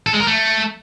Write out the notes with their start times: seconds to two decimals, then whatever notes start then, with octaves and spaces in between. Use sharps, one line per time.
0.06 A4
0.13 G#3
0.20 A#4
0.27 A3